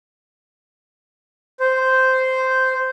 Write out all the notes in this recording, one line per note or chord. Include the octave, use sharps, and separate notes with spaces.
C5